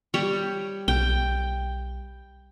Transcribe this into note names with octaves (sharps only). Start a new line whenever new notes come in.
G3 C#5 G5
B1 G5